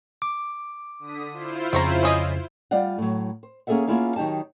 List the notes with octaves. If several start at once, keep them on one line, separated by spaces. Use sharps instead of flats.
D6
D3 D#6 B6
E4 F4 C5
F2 C#3 C4 C#5 A#5
C#4 G#4 D#5
G3 F4 D5 F5 F#5
A2 F#3
C5
A#3 C#4 G#4 A4 E5 F#5
A#3 B3 C#4 E4 F4 G#4
D#3 F#3 D#4 G4 A5